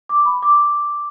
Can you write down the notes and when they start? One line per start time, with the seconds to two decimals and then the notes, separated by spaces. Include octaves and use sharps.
0.09 D6
0.26 B5
0.43 D6